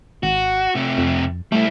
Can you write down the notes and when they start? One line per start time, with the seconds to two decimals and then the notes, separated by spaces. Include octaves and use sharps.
0.23 G#1 F#4
0.75 C3 A3
0.98 F2
1.52 G3 A3 E4